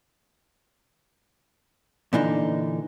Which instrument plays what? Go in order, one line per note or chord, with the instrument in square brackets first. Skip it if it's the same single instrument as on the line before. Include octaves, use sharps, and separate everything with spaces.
[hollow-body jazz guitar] A#2 D3 E3 D4 D#4